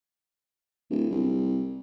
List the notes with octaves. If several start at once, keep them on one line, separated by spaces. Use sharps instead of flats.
D1
C2